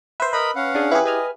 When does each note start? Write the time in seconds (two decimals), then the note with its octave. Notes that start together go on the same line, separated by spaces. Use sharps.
0.20 B4 C5 E5
0.33 A#4 B4 D#5 B5
0.56 C#4 F5 F#5
0.75 D4 G#4
0.91 E3 E4 G4 G#4 B4
1.05 B4 D#5 G#5 F6